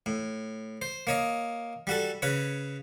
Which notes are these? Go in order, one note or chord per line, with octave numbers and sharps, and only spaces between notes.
A2
C5
A#3 C#5 D#5
G3 F#4 A4
C#3 B4 C#5